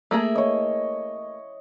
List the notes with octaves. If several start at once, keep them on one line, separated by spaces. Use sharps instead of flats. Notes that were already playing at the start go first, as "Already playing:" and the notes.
A3 A#3 G#4 E5
C#5 D#5